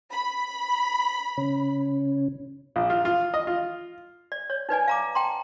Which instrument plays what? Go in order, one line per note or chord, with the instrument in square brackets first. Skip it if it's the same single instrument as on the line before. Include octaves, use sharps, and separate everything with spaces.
[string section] B5
[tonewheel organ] C#3 C#4
[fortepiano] A#1
F4
F4
D#5
F4
[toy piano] D5
C#5
D#4 B4 D5 G#5
F5 A#5 D6
G5 A5 A#5 C6